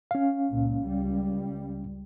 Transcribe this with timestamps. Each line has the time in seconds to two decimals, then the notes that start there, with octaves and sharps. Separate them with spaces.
0.11 C#4 F5
0.50 C#2 A#2
0.83 C#2 G3